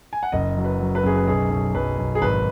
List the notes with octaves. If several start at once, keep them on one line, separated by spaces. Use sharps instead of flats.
G#5
F#5
F#1 D#5
F#3
B4
F#3
B4
F#2 G#4
B4
B1 G#4
B1
B1 B4
B1
G#4
G#1 B4